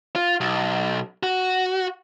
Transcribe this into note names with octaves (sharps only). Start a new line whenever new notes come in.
F4
B1
F#4